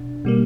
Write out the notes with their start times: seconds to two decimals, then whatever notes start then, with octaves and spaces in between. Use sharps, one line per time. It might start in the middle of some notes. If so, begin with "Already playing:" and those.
Already playing: B2 D4
0.25 B2 G3 A#3